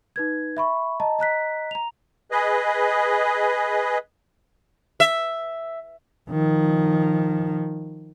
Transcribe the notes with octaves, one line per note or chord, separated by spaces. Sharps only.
D#4 B4 G#6
E5 B5 C#6
D#5 A5 A#5
D#5 A#5 F#6 B6
A#5 F7
G#4 B4 D#5
E5
D#3 F3